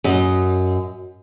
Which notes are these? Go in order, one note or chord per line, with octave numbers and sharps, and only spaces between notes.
F#2 D#5